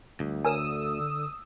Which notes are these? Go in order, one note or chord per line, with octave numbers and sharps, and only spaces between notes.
D2 G3
D3 A#4 C#5 G#5 D#6 E6